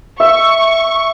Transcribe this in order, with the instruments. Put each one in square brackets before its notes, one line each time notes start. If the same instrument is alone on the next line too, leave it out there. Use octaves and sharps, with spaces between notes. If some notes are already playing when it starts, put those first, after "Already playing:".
[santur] E5 [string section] C#6